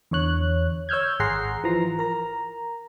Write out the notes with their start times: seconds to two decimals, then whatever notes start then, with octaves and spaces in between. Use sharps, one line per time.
0.11 E2 D3 C#5 F#6
0.89 C#5 E6 F6 G6 G#6
1.20 G#1 G#4 F#5 A#5 C6 C7
1.64 E3 F3 A#5
1.99 A#4 A#5